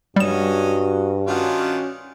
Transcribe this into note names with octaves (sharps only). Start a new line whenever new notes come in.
G2 F#3 G3 C#4 F#4 D#5 E7
D#3 C#4 D4 F4 F#4